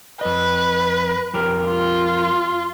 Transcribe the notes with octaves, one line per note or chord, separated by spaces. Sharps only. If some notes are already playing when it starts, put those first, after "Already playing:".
F2 B4 D#5
F2 G4 A#4
F4